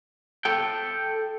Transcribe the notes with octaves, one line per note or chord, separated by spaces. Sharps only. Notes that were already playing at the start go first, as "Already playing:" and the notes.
A4 G5